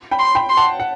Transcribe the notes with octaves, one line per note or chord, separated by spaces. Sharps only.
G5 B5
C6
G5 B5
C6
F#5 A5
F#5